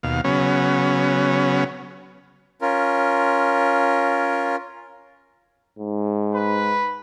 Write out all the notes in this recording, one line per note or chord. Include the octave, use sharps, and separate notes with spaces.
D#2 B2 F5
C#3 F#3 B3 C#4
C#4 F4 A#4
G#2
B4